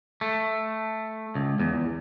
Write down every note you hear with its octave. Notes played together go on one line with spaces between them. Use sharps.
A3
C#2
E2